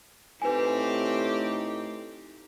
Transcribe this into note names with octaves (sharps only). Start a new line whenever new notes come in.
A2 C4 D#4 G4 B4 G#5